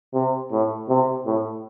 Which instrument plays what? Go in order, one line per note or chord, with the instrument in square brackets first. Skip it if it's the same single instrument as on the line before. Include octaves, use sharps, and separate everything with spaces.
[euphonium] C3
A2
C3
A2